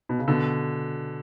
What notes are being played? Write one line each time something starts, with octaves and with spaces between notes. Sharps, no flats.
B2
C#3
B2 D3